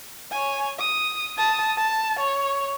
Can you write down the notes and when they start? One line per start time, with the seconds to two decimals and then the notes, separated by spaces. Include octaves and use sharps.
0.32 C#5 G#5
0.79 D#6
1.38 A5 D#6
1.77 A5
2.19 C#5